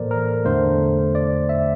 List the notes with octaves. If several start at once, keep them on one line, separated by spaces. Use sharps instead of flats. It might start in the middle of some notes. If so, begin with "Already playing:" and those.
Already playing: A2 E3 A#3 A4 A#4 C5 D5
A#4
E2 D3 A3 C5
D5
E5